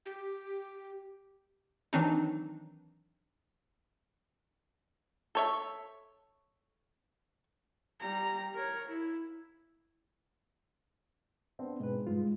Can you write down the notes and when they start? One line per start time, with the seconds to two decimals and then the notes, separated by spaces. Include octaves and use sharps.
0.06 G4
1.93 D#3 E3 F#3 C4 D4 D#4
5.35 A4 C#5 E5
8.00 G3 A#5
8.55 A#4 C#5
8.88 E4
11.59 B3 C4 D4
11.80 G#2 B2 B4
12.07 G2 G#3 F4